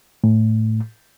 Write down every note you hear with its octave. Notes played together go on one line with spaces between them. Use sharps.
A2